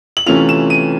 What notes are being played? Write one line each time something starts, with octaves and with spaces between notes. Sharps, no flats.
F#7
C3 E3 A3 C#4 F4 F7
E7
D#7